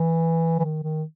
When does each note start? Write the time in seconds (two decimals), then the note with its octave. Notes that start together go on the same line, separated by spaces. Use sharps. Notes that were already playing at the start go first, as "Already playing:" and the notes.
Already playing: E3
0.59 E3
0.64 D#3
0.83 D#3